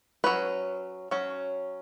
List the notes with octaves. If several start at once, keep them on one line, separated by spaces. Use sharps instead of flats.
F#3 C#4 B4
F#3 C#4